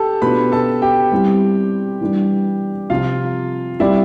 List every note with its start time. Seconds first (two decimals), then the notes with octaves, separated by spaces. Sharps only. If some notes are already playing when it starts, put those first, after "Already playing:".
Already playing: G4 A4 A5
0.22 B2 B3 D4 F4 B4 B5
0.52 A4 A5
0.82 G4 G5
1.12 G3 C4 E4
2.01 E3 G3 D4
2.90 C3 F3 C4 F4 F5
3.80 G3 C4 E4 G4 D5 E5